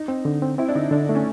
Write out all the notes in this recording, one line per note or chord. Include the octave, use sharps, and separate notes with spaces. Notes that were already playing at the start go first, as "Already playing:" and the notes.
Already playing: D#4
C4
D3
C4
C4 E4
D4
D3 D#4
D3 D4
A3
C#4